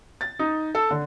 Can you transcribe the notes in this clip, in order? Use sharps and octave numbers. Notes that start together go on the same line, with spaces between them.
A6
D#4
A4
D3